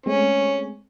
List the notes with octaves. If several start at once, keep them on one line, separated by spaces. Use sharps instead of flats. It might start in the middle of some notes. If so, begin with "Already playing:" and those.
G#3 A3 C4 C#4